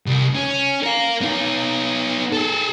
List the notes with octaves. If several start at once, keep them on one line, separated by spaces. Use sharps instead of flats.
C2
C#4
A#4 F5
B3 D#4
G#4 A4